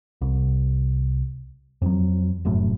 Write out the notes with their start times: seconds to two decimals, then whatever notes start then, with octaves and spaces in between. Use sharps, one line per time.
0.21 C2
1.82 F2 F#3
2.45 F1 F#2 A2